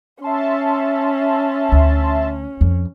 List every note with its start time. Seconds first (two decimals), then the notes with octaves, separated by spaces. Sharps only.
0.22 C#4 E5 A5 C6
1.72 D2
2.61 F2